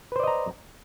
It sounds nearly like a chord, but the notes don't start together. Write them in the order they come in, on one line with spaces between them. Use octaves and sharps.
B4 C5 D5 D#5 A#5